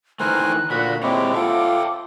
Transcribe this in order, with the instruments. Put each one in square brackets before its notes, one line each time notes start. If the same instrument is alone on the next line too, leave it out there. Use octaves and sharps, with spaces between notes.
[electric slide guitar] D#3 E3 A3 [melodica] A#4 C5 G#5 [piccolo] F#6
[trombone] A#2 [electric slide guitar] D3 F#4 [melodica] B5
[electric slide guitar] A#2 G4 C#5 [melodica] G#3 E4 [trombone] C4 [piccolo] D6
[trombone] F4 [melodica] A4 [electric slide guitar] E5 F#5 G5